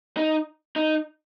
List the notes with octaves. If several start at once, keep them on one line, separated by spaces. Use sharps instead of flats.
D#4
D#4